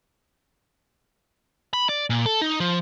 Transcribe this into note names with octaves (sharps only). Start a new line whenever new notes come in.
B5
D5
A#2
A4
D#4
F3